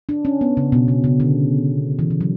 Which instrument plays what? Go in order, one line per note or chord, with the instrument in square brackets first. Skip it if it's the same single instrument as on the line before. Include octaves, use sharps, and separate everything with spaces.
[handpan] D4
C#4
B3
C#3
B2
C#3
C#3
D3
E3
E3
F#3